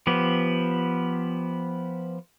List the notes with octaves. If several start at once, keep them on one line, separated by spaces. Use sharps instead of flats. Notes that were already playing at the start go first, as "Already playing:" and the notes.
F3 B3 G4